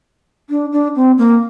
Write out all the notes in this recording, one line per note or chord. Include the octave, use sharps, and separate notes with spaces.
D4
D4
C4
A#3